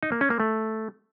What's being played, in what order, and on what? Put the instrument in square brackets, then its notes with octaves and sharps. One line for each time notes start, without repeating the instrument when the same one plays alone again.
[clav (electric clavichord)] D#4
A#3
C#4
A#3
A3